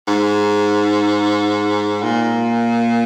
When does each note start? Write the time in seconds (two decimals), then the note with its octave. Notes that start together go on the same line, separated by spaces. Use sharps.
0.08 G#2
2.03 A#2